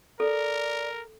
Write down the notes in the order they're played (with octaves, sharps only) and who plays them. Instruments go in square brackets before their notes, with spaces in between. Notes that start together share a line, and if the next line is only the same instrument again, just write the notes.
[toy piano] A4 [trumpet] A#4 [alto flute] D5